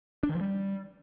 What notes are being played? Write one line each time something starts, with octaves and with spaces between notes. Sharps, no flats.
D4
D#3
F3
G3